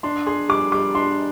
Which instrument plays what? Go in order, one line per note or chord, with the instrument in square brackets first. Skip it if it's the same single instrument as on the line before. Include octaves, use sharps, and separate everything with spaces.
[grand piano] D4 [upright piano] C6
[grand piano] G#4 [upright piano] C6
[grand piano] G3 [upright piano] D6
[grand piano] G3 [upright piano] D6
[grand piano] D4 [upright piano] C6